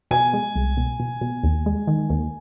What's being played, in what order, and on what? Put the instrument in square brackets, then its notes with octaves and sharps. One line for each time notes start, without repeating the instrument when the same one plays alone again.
[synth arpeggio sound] B2 [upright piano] G#5
[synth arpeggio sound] G#3
C2
B2
B2
B2
D#2
G#3
D#3
D#2